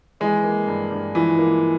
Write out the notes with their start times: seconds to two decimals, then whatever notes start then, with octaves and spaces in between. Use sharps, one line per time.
0.20 E3 G#3
0.44 A#3
0.67 G2
0.91 G2
1.15 E3 F3
1.39 A#3